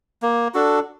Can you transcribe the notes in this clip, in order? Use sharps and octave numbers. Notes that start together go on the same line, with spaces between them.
A#3
D4 F#4 A4